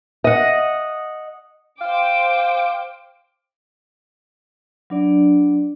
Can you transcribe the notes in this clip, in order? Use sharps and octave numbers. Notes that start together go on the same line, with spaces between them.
D#5 F#5
C5 F5 G5 D6
F#3 D4 D5